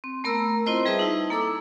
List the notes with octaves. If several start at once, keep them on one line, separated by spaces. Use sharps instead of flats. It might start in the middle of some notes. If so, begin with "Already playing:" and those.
C4
A3 B3 A#4 A#5 E6
C4 E4 F4 C5 D#5
G3 G#4 B4 E5 A5 D#6
D#4 E4
A#3 A4 D6 E6